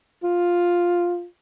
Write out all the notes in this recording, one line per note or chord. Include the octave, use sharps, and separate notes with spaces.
F4